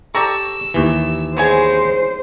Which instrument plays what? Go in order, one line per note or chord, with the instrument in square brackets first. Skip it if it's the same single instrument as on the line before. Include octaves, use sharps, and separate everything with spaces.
[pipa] G4 A#5 C#6 [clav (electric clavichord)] A4 D5 [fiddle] E6
[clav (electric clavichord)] D#2 E3
[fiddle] G#3 [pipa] B3 C#5 G#5 [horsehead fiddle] C5